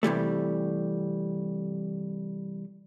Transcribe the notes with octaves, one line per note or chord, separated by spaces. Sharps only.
C3 E3 G3 A3